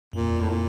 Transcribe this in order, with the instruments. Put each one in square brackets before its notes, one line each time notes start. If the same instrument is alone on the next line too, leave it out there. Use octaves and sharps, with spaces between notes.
[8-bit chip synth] F#2 [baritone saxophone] A#2
[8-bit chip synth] F2
E2
[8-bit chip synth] F2 [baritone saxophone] A2
[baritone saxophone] A#2